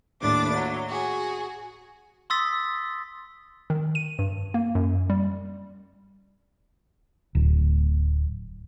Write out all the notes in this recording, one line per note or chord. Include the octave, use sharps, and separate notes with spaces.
D#2 A2 D4 D6 A6
F#3
F#4 G#4
C6 D#6 E6 A6 B6
D#3
D#7
G2
A#3
F#2
G3
D1